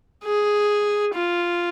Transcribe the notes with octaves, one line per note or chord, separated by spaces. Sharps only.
G#4
F4